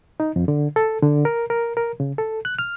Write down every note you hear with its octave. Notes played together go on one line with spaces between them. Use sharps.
D#4
F2
D3
A4
D3
A#4
A#4
A#4
C#3
A4
F#6
F6